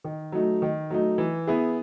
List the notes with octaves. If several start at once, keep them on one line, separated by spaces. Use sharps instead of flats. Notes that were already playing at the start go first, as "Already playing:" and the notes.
D#3
F#3 A3 D#4
D#3
F#3 A3 D#4
E3
B3 E4 G#4